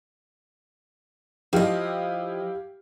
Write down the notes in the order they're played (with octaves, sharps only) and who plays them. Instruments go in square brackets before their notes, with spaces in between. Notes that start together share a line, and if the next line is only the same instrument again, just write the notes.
[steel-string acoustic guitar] F3 D#5 [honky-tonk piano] E4 G4 F5